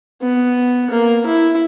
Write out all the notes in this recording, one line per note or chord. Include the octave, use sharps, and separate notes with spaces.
B3
A#3
E4